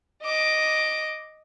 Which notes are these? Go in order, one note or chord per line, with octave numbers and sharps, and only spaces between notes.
D#5 D6